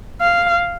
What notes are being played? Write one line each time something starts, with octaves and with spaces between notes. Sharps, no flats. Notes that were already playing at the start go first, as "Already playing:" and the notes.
F5